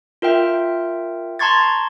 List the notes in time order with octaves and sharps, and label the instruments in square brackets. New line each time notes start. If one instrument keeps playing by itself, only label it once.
[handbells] F4 A#4 E5 G5
A5 A#5 C6 C#6 G#6 A6